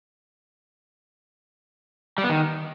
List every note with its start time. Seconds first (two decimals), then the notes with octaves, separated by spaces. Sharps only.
2.18 G3
2.24 B3
2.29 D#3